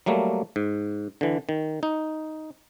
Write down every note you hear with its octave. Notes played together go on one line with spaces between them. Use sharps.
F#3 G3 A3 A#3
G#2
D3 E3
D#3
D#4